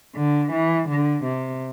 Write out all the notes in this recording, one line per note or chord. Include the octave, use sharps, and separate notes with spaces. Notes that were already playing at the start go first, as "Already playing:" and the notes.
D3
E3
D3
C3